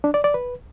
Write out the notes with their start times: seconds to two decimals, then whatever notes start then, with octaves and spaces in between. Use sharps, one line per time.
0.04 D4
0.14 D5
0.24 D5
0.34 B4